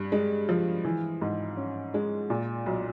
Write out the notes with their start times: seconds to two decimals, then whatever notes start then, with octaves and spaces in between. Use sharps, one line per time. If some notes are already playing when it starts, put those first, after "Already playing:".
Already playing: G2
0.12 G#3
0.49 F3
0.85 E3
1.22 G#2
1.57 C#4
1.94 G#3
2.30 A#2
2.66 B1